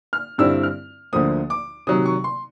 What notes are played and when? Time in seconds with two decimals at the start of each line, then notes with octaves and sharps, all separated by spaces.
0.13 F6
0.38 G2 D3 G3 C4 E4 E6
0.63 F6
1.13 D2 D3 F3 A#3 D#6
1.50 D6
1.87 C3 D#3 F#3 D#6
2.06 C#6
2.24 C6